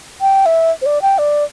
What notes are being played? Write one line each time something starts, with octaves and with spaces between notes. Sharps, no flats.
G5
E5
C5
D5
G5
D5